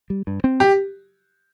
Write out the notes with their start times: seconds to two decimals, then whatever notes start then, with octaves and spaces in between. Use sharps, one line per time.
0.10 G3
0.27 G2
0.44 C4
0.60 G4